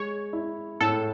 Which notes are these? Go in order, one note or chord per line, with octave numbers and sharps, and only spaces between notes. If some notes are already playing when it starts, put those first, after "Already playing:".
Already playing: G#3 C#5
E4
A2 A4